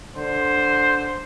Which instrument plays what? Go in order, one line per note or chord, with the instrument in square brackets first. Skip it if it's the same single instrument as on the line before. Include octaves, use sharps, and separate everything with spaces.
[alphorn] D3 [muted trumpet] C5